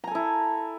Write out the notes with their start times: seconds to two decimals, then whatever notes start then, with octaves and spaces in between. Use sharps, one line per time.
0.04 A#5
0.07 G#5
0.11 A4
0.15 E4